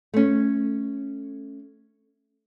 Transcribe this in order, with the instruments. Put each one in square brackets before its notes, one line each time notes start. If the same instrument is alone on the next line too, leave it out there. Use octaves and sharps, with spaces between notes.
[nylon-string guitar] A3 C#4